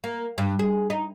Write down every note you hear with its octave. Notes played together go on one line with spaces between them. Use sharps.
A#3
G2
G#4
D#4